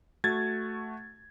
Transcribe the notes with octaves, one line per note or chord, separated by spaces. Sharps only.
A3 F#4 G#6 A6